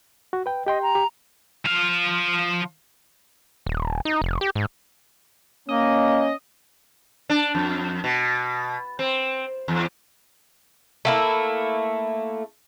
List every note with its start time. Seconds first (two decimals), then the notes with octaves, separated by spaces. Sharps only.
0.33 F#4
0.46 B4 G5
0.66 G4 D#5 G5 C6
0.82 A#5
0.95 G4
1.65 F3 F5
3.66 D#1
4.05 D#4
4.22 F1
4.41 G4
4.55 G#2
5.69 A#3 C#4 D#5
7.29 D4
7.55 F2
8.04 B2
8.99 C4
9.68 E2
11.05 A3 A#3 E4